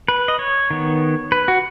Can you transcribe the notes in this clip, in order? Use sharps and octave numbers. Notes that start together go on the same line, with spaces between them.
B4
D#5
C#5
D#3 B3
B4
F#4